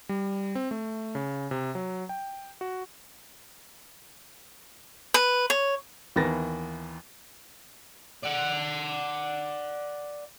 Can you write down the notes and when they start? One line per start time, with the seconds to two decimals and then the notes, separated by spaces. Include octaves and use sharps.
0.09 G3
0.55 C4
0.71 A3
1.15 C#3
1.51 C3
1.75 F#3
2.09 G5
2.61 F#4
5.14 B4
5.50 C#5
6.16 D#2 E3 B3 A#4 A6 A#6
8.23 D5 F#5